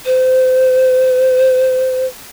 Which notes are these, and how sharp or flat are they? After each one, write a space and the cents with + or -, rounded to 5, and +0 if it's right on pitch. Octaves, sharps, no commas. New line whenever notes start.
C5 -25